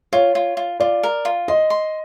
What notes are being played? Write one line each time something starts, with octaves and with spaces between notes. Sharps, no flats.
F4 C#5
F4
F4
F4 D5
A#4
F4
D#5 C6
C6